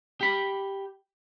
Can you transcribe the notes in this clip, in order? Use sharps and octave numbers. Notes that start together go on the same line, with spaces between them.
G4 B5